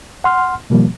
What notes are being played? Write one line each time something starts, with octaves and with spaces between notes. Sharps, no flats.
F#5 C6 F6
B2 D#3 F3 G3 A#3